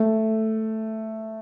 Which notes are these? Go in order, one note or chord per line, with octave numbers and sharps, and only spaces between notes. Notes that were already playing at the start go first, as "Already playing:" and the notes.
Already playing: A3